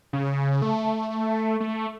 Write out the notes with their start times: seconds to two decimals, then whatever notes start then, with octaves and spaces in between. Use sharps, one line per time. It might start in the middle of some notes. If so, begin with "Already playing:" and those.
0.13 C#3
0.62 A3
1.60 A3